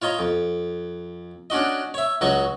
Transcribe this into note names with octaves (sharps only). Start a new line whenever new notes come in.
F4 C#5 D#5 A#5
F2
C#4 D4 F#4 D#5
C#5 E5
C#2 F#3 F#4 D#5 C#6